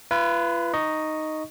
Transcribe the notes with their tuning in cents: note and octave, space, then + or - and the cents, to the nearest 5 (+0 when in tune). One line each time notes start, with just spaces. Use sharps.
F4 -40 B4 +0
D#4 +0 D#5 +0 C#6 +0